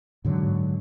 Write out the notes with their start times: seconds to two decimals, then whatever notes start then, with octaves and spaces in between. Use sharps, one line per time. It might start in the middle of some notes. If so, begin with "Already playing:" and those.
0.25 G#2 D3 F#3